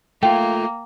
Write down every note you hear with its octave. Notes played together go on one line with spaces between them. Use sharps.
A3 A#3 F4 G5